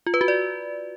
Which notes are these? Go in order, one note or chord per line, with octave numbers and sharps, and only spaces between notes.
F4
B4
F#4
D5